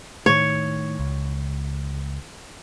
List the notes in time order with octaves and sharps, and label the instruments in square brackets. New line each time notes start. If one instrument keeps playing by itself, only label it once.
[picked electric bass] A2 D#3 [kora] C#5
[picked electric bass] C#2